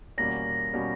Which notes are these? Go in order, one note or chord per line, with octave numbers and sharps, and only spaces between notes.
E2 B2 G3 A#3 C#4 A#6
B2 G3 A#3 C#4